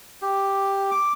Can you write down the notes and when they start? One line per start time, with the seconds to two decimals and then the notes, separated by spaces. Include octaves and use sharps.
0.22 G4
0.91 D6